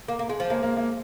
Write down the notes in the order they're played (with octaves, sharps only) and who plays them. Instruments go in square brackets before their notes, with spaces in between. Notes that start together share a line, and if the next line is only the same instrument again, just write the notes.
[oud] A#3
A#3
G#3
F3
[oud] G#3 [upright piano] A#3
[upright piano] A#3
A#3